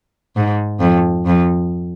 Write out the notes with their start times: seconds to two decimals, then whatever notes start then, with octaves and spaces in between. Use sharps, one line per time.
0.37 G#2
0.80 F2
1.26 F2